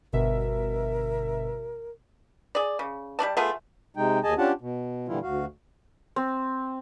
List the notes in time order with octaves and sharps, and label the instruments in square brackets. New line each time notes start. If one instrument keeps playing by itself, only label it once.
[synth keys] G1 B2 E5 [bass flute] A#4
[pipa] G#4 D5
C#3
G3 D4 D5 A5
A3 B3 F4 G#4
[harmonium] C3 G#3 D#4 G5
D#2 G#4 D#5 G#5 A5
C#4 D4 F4 G4 F#5 A5
B2
A#2 D3 E3 G3 E4 F4
D2 F#4 F5
[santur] C4